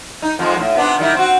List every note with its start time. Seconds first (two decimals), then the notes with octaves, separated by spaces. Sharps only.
0.22 D#4
0.39 F2 F3 G#3
0.56 F#2 A2
0.75 C3 B3 D4
0.99 D#3 G3 E4
1.15 C4 F#4